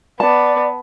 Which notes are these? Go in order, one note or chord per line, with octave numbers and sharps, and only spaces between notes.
B3 D5 A5